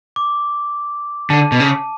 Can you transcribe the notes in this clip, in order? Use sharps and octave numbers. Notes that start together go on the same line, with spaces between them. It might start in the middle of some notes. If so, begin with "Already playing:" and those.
D6
D3 A5
B2
C#3